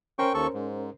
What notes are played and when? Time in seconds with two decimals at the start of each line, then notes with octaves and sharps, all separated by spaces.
0.19 C#4 A#4 C5 G5 C#6
0.34 D#2 A4 C#6
0.54 G#2